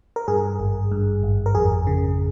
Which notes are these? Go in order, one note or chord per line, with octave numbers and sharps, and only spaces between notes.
A#4
G2 G#4
G#1
G2
G#1
A#4
F2 G#4
C#3